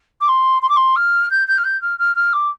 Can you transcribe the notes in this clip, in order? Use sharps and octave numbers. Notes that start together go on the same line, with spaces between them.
D6
C6
C6
D6
C6
F6
G6
G6
F6
G6
F6
F6
F6
D6